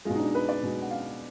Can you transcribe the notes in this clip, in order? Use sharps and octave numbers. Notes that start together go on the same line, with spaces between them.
B2 G#3 F4
D#4
D4
B4
D5
B2 G#3
F#5
F5